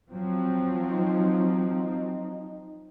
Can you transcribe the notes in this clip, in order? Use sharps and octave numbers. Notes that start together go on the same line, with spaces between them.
F3 F#3 C4
D#4